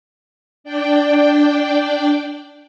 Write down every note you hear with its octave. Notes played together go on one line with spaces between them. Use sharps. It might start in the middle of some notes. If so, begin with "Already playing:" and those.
D4 D5 G5